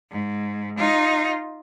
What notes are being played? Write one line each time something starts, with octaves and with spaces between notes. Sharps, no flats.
G#2
D#4 F4